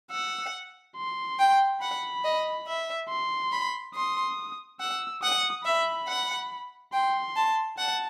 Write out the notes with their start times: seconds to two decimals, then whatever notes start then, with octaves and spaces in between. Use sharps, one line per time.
0.12 F#5 E6
0.97 C6
1.39 G5
1.82 F#5 B5
2.24 D#5
2.67 E5
3.10 C6
3.52 B5
3.95 C6 D#6
4.81 F#5 E6
5.23 F#5 D#6
5.65 E5 B5
6.09 F#5
6.93 G5 C6
7.36 A5
7.78 F#5 A5